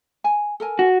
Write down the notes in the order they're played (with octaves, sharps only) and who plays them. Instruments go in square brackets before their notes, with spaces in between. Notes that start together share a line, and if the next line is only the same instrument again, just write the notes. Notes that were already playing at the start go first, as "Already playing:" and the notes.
[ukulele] G#5
A4 A#4 G#5
[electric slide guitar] F#4